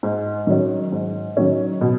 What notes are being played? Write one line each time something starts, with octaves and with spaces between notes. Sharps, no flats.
G#2
D#3 F#3 C#4
G#2
D#3 F#3 C#4
B2